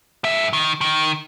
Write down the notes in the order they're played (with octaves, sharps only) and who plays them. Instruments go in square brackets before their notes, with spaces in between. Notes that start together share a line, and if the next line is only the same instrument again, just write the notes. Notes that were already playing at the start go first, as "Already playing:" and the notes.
[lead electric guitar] G2 E5
D#3
D#3